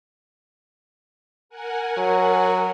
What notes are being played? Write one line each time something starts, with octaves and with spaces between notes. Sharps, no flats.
A#4 F#5 G#5
F#3